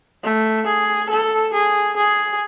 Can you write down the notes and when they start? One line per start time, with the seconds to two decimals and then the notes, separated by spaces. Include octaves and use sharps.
0.23 A3
0.67 G#4
1.10 A4
1.54 G#4
1.97 G#4